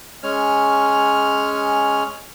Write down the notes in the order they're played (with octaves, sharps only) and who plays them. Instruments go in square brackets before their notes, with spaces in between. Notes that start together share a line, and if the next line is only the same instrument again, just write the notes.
[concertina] G#3 C#4 C#5 F6